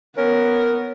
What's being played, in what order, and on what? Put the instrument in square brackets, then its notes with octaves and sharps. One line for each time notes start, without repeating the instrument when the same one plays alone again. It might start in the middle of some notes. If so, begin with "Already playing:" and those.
[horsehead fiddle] B3 [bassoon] C#4 [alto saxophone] A#4